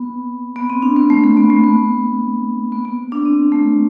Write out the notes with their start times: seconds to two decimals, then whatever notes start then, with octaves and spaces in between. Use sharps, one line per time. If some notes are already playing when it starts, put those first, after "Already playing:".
Already playing: B3
0.56 B3
0.70 C4
0.82 D4
0.96 B3
1.10 A3
1.24 A3
1.37 B3
1.50 A3
1.64 B3
2.72 B3
2.85 B3
3.12 D4
3.25 C4
3.52 A3